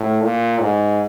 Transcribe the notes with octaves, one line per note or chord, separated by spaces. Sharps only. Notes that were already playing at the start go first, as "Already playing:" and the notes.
Already playing: A2
A#2
G#2